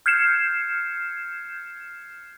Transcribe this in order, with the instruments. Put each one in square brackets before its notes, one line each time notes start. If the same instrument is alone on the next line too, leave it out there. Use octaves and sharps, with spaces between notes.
[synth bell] F6 G6 G#6 C7 C#7 E7